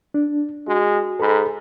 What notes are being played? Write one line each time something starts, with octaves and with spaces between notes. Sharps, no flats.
D4
G#3 F#4
G#2 A4 B5